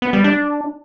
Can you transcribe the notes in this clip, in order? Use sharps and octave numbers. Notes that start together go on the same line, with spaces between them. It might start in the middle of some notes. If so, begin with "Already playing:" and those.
B3
G3
D4